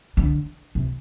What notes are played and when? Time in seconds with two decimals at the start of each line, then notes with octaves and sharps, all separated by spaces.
0.17 D3
0.75 C3